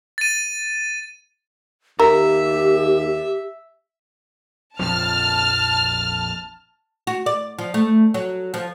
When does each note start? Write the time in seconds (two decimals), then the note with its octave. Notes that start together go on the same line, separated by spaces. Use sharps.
0.18 A6 D#7
1.99 D#2 G4 A#4 E5
4.79 A#1 F2 F3 A5 F6
7.07 F#4
7.26 D5
7.59 F3
7.74 A3
8.14 F#3
8.54 F3